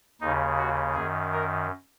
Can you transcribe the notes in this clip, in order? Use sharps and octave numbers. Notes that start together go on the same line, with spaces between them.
D#2 C#3 D#4
F#4
F#2 D#3 G#4
A#4